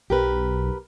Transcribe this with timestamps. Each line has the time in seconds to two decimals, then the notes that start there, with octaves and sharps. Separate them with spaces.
0.10 B1 G4 A#4 B4